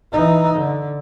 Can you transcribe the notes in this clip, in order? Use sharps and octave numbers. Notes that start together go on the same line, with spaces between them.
E3 D#4
D3